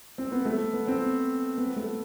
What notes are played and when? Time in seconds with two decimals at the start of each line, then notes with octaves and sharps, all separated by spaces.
0.18 C4
0.32 B3
0.45 A3
0.73 B3
0.88 C4
1.58 B3
1.76 A3